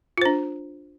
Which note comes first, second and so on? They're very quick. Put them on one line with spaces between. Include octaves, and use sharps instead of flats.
F4 C5 D4